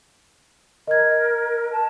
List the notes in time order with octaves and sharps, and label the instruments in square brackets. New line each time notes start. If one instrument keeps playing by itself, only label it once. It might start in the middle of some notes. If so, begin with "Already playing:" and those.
[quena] A#4 [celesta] D#5 G#6
[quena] A5